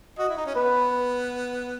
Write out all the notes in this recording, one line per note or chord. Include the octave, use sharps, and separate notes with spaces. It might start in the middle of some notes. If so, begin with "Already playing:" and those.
F#4 D#5
E4
D#4
C#4
B3 B4